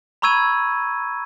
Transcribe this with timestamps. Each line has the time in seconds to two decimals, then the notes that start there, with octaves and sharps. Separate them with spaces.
0.22 A#5 B5 C#6 E6 G#6 D#7